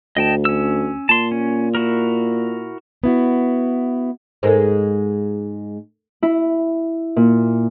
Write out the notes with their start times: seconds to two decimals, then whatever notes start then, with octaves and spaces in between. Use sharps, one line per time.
0.17 D2 D#5 G5 A5
0.45 C#4 E6
1.09 A#2 A5 C6
1.31 C#4
1.75 E4 F#4 A#4
3.04 B3 E4 F#4
4.43 G#2 G#3 A4 A#4 C5
6.23 E4
7.16 A#2